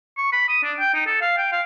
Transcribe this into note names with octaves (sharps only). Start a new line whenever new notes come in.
C#6
B5
D#6
D4
G5
D#4
A4
F5
G5
F5